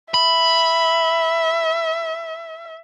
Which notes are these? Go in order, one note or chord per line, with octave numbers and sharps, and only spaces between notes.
E5 B5